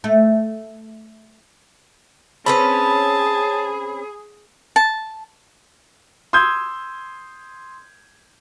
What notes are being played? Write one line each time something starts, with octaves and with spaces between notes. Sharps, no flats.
A3
C4 C#4 G#4 B4 A5 B5
A5
C6 D#6 E6 G6 G#6